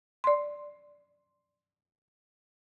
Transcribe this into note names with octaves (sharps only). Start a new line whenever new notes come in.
D5 C6